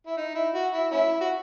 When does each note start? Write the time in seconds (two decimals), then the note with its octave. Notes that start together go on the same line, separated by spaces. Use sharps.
0.06 E4
0.17 D#4
0.35 E4
0.54 F#4
0.73 E4
0.92 C#4 E4
1.21 F#4